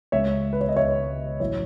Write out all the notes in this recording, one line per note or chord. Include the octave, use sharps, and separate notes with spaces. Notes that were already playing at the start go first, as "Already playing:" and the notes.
C#2 C#3 G#3 C#5 E5
B4
C#5
D#5
C#2 C#3 G#3 C#5 E5
A1 A2 F#3 A3 C#5 E5